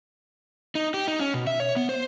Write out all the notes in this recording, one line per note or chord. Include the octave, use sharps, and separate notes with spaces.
D#4
G4
D#4
C#4
B2
E5
C#5
B3
C5